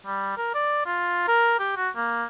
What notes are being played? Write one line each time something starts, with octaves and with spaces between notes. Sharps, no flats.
G3
A#4
D5
F4
A#4
G4
F#4
A#3